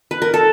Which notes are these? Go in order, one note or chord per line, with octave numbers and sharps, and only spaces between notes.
B4
A#4
A4